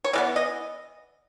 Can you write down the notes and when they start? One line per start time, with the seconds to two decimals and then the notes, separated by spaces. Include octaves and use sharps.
0.04 C#5
0.13 E3 G#3 B3 D5
0.36 D#5